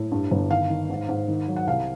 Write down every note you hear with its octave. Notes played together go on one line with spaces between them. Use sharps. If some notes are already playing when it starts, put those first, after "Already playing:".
Already playing: A2
G2
G1
D#3 F5
D#3
G#2
G#2
D#3
F#3
F#5
C2 F5